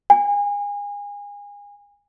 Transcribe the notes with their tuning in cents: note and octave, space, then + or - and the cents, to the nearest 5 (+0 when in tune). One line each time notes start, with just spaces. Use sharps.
G#5 -30